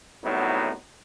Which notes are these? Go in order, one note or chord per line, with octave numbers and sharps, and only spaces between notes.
C2 A2 F#3 B3 D#4